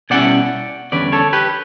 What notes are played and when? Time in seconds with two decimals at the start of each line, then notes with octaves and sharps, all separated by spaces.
0.10 B2 G3 C#4 E4 D5 F#5
0.92 E2 D3 G3 C#4 B4 D5
1.12 A4 C#5
1.33 G4 B4